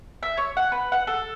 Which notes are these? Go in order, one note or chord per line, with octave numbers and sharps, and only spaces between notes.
E5
C#5
F#5
B4
F#5
A4